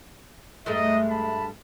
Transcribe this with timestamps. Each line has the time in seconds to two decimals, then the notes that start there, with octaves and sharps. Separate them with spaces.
0.66 G2 G#3 A3 D#4 D#5
1.09 A5 B5